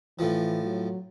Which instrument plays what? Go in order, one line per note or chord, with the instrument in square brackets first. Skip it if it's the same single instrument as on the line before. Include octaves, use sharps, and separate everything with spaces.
[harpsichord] A2 F3 [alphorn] E3
[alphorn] F#3